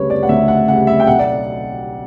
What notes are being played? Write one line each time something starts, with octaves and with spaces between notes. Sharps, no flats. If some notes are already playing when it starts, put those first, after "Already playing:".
Already playing: D2 C#3 G3 B4 C#5
D5
F#5
D2 E5
F#5
C#3 G3 F#5
E5
G5
B1 F#5
D5